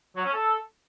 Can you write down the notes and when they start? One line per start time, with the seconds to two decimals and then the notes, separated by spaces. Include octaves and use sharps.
0.16 F#3
0.25 C#4
0.33 A4